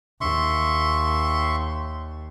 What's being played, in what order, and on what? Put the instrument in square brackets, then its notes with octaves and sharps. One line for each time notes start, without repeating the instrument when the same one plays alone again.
[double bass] D#2 [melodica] E5 C6 C#6